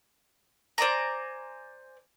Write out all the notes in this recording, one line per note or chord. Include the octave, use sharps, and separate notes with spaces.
C5 D5 G#5 A#5